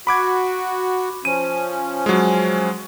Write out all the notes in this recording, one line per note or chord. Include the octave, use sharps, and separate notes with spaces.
F#4 B5 D6 G#6
F3 C#4 D#7
F#3 G#3